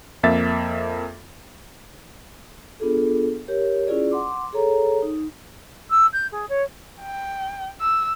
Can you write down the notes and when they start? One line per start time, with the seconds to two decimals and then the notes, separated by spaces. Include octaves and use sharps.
0.23 F2 A#3 E5 A6
2.80 B3 D4 F4 G#4 A4
3.48 G4 A#4 C#5
3.87 C#4 E4 F4 G#4 D5
4.11 F#5 C6 D6
4.53 G#4 A4 C#5 A#5
5.02 D#4
5.90 E6
6.13 G6
6.32 G#4
6.49 C#5
7.01 G5
7.81 E6